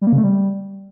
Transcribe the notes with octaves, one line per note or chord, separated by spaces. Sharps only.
G3
A#3
C#3
A3
G3